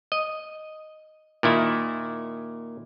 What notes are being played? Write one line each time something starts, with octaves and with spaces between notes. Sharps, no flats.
D#5
A#2 D#3 E4